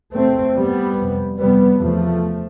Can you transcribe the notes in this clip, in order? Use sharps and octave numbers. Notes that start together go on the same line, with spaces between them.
E2 C3 A3 C4
G2 G3 B3
F2 C3
F2 C3 G3 B3
E2 C3 F3 A3